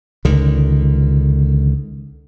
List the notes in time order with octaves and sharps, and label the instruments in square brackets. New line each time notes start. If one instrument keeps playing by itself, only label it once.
[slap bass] C#2 D3 D#3